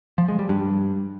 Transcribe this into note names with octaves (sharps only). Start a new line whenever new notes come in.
F3
G#3
G3
G2